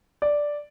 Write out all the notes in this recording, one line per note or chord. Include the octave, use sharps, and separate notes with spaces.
D5